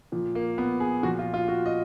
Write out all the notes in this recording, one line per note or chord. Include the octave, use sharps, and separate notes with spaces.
A#2 F3
A#3
B3
G#4
A#2 F3 F#4
F4
F4
F#4
D#5